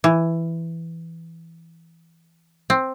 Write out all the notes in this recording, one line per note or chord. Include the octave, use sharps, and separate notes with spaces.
E3
C4